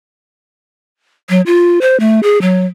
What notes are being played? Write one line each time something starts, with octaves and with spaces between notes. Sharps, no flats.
F#3
F4
C5
A3
G#4
F#3